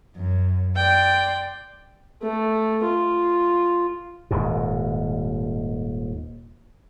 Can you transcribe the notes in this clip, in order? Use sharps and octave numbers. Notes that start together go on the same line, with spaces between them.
F#2
D5 G5 C6
A3
F4
D#1 D#2 G#2 B2